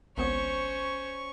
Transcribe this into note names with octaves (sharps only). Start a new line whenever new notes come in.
G#1 C#2 B3 C#4 C5 C#5 C#6